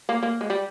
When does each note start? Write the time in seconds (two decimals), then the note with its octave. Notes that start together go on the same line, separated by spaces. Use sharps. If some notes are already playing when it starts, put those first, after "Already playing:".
0.09 A#3
0.23 A#3
0.41 G#3
0.50 G3